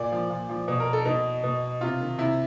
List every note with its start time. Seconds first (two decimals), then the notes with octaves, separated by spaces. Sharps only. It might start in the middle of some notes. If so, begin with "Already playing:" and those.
Already playing: A#2 D5
0.12 F3
0.30 A#2
0.50 F3
0.68 B2
0.80 A#4
0.93 A4
1.05 B2 D#4
1.44 B2
1.81 C3 F4
2.00 D#3
2.18 C3 E4